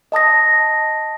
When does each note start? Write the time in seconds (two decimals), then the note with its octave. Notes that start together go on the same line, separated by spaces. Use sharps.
0.12 D#5 A5 D#6 A#6